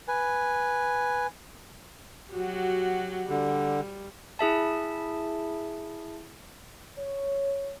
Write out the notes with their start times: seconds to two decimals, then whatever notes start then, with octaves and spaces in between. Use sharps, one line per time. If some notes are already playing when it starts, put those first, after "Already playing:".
0.08 B4 G#5
2.32 F#3 F#4 G4
3.29 D3 G3
4.39 E4 G#4 E5 A5
6.97 C#5